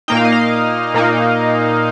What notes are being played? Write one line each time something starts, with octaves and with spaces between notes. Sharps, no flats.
A#2 A#3 D#4 G5
F5
D#5
F5
A#2 A#3 D#4